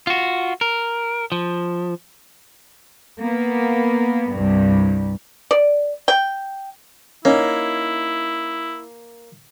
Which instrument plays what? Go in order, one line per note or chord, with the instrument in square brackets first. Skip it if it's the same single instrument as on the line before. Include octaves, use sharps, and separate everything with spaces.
[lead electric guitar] F4 F#4
A#4
F3
[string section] A#3 B3
C2 G2
[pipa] D5
G5
[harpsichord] A#3 [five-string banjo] C#4 D#4 [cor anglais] E4